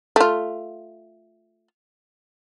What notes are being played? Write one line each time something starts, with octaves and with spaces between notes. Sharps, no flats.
A3 F4